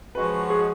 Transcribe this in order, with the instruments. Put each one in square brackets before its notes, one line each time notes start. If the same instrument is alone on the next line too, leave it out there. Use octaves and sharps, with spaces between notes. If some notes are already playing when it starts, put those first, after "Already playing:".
[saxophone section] F3 G#3 C#4 F#4 [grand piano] B4
[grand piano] G#4